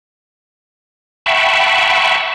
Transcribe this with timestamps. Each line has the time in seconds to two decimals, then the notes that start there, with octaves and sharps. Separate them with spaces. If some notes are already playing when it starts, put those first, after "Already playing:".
1.26 E5 F#5 G5 A5 B5 C#6